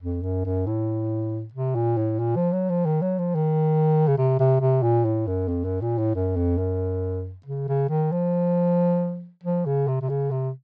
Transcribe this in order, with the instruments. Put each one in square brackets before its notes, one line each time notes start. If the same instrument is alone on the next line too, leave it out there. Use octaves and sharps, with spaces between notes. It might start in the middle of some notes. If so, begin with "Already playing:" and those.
[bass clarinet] F2
F#2
F#2
A2
C3
A#2
A2
A#2
F3
F#3
F3
D#3
F#3
F3
D#3
C#3
C3
C3
C3
A#2
A2
F#2
F2
F#2
A#2
A2
F#2
F2
F#2
C#3
C#3
D#3
F3
F3
C#3
C3
C3
C#3
C3